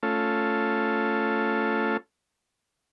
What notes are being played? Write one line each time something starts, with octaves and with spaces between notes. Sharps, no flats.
A3 C#4 F4 A4